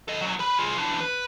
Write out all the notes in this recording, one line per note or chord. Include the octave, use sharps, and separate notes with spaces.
A4 D#5
E2 F#3
A#4 B4
F4 G#4
E3 D4
B4